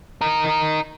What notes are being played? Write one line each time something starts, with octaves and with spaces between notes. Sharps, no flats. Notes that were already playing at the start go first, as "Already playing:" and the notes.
D#4 A#4